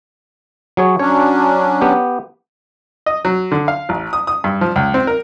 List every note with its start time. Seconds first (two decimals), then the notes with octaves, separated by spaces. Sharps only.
0.77 F#3 G#4 C#5
0.99 F#3 C#4 D4 C#5
1.81 B3 G4
3.06 D#5
3.25 F#3
3.52 D3
3.68 F5
3.89 A1
4.13 D#6
4.27 D#6
4.44 G2
4.61 F3
4.76 C#2
4.94 C4
5.07 A#4